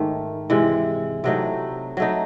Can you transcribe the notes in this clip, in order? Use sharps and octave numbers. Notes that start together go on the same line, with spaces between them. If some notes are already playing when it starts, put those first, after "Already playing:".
Already playing: G#2 D#3 A3
C3 E3 G#3
C3 F#3 A3 D#4
F#3 A3 D#4